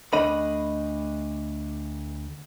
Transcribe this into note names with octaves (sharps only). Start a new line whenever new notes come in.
D2 A3 D4 D#5 B5